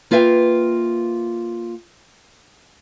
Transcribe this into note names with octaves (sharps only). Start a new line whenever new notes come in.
A#3 F4 B4 E5 F5 G5